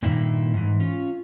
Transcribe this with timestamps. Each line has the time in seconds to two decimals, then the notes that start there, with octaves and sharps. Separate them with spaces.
0.02 G2 A#2 D#3 A#3 E4
0.54 G#2 E3
0.80 C#4 F4